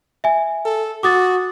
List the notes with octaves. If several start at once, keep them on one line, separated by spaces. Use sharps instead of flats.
E5 G#5
A4
F#4 D6 D#6 A6